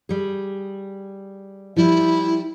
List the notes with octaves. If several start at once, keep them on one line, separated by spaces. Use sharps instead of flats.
G3 G#4
F3 G3 E4